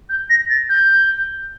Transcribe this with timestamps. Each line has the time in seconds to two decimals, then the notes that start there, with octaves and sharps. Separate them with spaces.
0.10 G6
0.30 A#6
0.50 A6
0.69 G6